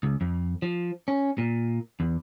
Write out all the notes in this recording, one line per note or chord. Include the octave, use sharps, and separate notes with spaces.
C#2
F2
F3
C#4
A#2
E2